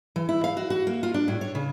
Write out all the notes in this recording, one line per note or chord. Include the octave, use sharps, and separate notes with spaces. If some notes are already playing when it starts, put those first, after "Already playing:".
E3
E4
F5
F#4
F#4
A#3
F4
D4
A2
C#5
C#3